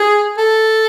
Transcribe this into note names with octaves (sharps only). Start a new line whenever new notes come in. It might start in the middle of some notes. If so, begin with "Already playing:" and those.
Already playing: G#4
A4